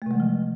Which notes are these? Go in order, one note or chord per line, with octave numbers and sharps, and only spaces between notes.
C3 E3 F3 G#3 A3